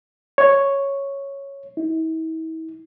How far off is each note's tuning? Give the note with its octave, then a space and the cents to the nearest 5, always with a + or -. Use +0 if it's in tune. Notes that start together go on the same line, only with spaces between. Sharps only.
C#5 +0
E4 -45